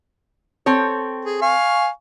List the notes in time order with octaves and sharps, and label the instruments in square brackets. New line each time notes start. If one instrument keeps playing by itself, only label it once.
[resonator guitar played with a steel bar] C4 A4 C#5
[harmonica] G#4
F5 G#5 C#6